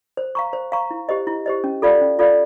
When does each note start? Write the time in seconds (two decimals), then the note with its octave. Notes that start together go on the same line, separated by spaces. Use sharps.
0.17 C5
0.35 F5 A#5 C#6
0.53 C5
0.72 F5 A#5 C#6
0.91 E4
1.09 G4 C5 D#5
1.27 E4
1.46 G4 C5 D#5
1.64 C#4
1.82 F4 A4 D5 F5
2.01 C#4
2.19 F4 A4 D5 F5